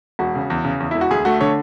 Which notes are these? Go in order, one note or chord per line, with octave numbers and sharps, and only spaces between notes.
E1 F#4
C#3
E2
C#3
E2
E1 E4
F#4
D2 G#4
A3 F#4
D3 C#5